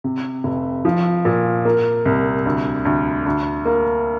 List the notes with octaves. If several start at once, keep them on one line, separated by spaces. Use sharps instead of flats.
C3
F1
F3
A#2
A#3
C2
D2
D2
D2
A#3